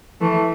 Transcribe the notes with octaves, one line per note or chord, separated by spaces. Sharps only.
E3 A3